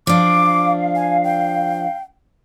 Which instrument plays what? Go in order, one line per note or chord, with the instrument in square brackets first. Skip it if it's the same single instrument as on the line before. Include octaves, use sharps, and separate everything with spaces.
[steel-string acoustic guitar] F3 D4 [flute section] F5 [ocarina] D6
[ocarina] G#5
G5